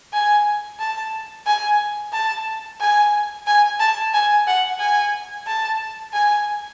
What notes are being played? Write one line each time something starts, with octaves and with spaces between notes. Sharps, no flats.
G#5
A5
G#5
A5
G#5
G#5
A5
G#5
F#5
G#5
A5
G#5